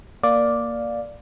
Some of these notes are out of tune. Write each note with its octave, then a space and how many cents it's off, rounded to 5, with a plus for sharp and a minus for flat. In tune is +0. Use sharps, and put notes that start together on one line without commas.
A#3 +0 D5 +0 F5 +5